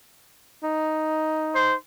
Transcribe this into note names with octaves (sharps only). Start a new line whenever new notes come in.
D#4
C5